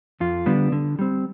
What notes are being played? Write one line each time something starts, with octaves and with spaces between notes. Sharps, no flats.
F2 F4
D3 G3 B3 D4
D3
G3 C4